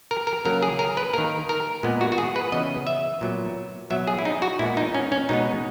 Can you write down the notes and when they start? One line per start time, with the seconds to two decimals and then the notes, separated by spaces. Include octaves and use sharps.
0.11 A#4
0.27 A#4
0.45 C#3 F#3 A#3 A#4
0.63 G#4
0.79 A#4
0.97 B4
1.14 D#3 A#3 A#4
1.49 A#4
1.83 A#2 G#3 B3
2.01 F#4
2.12 F#4
2.18 G#4
2.36 B4
2.52 C#3 E3 B3 D#5
2.87 E5
3.21 A#2 F#3 B3
3.90 B2 F#3 B3 E5
4.07 G#4
4.19 E4
4.25 D#4
4.42 F#4
4.59 A#2 G#3 B3 E4
4.77 D#4
4.95 C#4
5.12 C#4
5.29 B2 G#3 B3 D#4